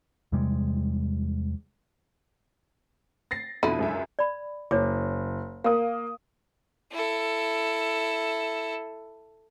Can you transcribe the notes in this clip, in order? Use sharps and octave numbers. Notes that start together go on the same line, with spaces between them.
E2 C3 G3 G#3
A6 A#6 C7
F2 B2 D3 E4 D#7
C#2 F#2 E5
D5 B5
F#1 C#5 D6
A#3 F5 D#6
E4 A4